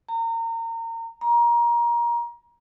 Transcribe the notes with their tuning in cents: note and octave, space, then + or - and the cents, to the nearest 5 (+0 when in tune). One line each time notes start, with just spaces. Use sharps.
A#5 -30
A#5 +25